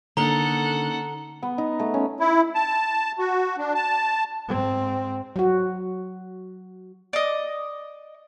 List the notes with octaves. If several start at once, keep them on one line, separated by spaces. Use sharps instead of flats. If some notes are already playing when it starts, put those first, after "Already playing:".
D3 A#3 C#4 D#4 A4 F#5 A#5 G7
B3
D#4
A3
C#4
E4
A5
F#4
D4
A5
G#2 C4
F#3 F#4
D5 D#5